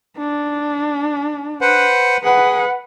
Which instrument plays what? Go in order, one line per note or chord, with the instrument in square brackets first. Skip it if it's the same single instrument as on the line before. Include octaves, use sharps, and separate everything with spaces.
[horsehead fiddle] D4
[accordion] B4 C5 F#5
[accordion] G#4 [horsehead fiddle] B4 F#5